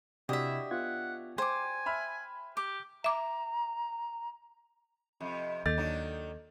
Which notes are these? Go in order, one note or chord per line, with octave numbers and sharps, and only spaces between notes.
C3 D4 E4 F#4 G4 D#5 E5
B3 F4 F#5 G#6
C5 G5 G#5 D6
E5 B5 F6
G4 D6
E5 A#5 D6
F2 C3
D#2 A4 D#5 G6 A6
D#3 F#3 D4